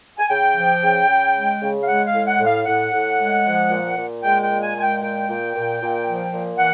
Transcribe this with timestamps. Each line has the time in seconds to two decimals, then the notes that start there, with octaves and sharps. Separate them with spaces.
0.18 G#5
0.29 C#3 G5
0.56 F3
0.82 C#3
1.08 C#3
1.35 G#3
1.60 C#3
1.83 F5
1.87 G#3 F#5
2.07 F5
2.13 A2
2.26 F#5
2.39 A2
2.46 F5
2.66 A2 F#5
2.92 A2
3.19 G#3
3.45 F3
3.71 A#2
3.96 A#2
4.23 G#3 G5
4.43 G5
4.50 A#2
4.63 G#5
4.76 G#3 G#5
4.82 G5
5.01 A#2 G5
5.28 A#2
5.55 A#2
5.81 A#2
6.07 F3
6.33 A#2
6.59 E3 F#5